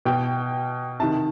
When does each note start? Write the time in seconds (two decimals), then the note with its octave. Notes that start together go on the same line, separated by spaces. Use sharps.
0.05 B2 G5
1.00 C3 D#3 A5